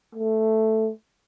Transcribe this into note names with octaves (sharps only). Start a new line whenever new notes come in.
A3